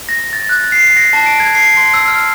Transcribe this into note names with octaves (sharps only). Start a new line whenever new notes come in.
A#6
A6
F#6
C7
A#6
A5
D7
G#6
C7
C6
E6
F6